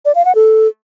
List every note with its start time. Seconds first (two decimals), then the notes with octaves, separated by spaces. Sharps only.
0.05 D5
0.15 F5
0.25 F#5
0.35 A4